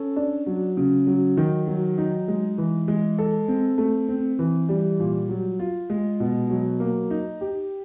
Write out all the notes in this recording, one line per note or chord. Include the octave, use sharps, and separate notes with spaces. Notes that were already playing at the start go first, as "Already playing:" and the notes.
Already playing: C#4 A4
D4
F#3
C#3
F#3
D#3
F#3
D#4
G#3
E3
G#3
A4
C4
A3
C4
E3
G3
A#2
F#3
F4
G#3
B2
F#3
A#3
D#4
G4